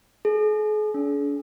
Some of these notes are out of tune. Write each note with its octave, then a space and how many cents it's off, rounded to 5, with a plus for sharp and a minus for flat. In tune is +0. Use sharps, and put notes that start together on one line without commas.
G#4 +40
D4 -45